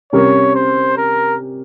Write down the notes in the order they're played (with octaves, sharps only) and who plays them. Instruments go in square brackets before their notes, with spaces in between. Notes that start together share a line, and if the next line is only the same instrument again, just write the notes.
[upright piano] C3 G3 C#4 G4 A#4 [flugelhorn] C#5
[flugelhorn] C5
A#4